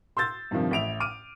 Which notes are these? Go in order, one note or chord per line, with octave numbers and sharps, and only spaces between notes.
C6 E6 G6 A6
G2 C3 D#3 F3
A1 E5 D7 F7
D6 F6 D7 D#7